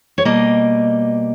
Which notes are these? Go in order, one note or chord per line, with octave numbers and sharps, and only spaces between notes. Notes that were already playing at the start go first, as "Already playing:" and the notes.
C#5
B2 G3 A#3 D#5